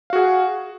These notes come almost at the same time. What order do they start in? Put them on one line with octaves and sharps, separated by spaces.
F5 F#4 G#4 F#5